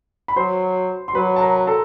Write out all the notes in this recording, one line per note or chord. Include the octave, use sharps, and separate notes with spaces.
B5
F#3 C5 C6
C6
F#3 B4 B5
A5
A#4 A#5
A4 A5